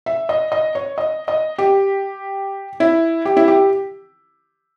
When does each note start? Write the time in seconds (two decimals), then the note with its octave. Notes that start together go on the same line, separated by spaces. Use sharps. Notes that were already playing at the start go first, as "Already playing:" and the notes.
0.06 E5
0.29 D#5
0.52 D#5
0.75 C#5
0.98 D#5
1.28 D#5
1.58 G4
2.80 E4
3.25 G4
3.37 E4
3.48 G4